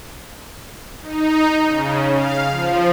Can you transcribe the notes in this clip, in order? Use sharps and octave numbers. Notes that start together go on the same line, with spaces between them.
D#4
C#3
F5
F3